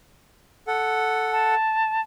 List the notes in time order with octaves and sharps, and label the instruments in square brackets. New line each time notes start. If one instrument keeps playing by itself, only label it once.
[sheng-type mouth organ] A4 F#5
[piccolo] A5